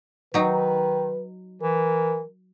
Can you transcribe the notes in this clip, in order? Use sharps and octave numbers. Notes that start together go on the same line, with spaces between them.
D#3 F#3 D#4 B4
E3 A#4